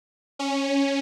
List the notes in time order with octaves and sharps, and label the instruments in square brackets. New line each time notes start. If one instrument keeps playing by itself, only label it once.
[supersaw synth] C#4